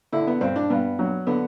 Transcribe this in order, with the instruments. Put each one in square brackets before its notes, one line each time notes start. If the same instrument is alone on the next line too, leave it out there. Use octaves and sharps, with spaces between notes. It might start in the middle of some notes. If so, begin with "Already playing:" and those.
[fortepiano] D3 E4
B3
G2 C4
D4
G2 B3
F#3
D3 B3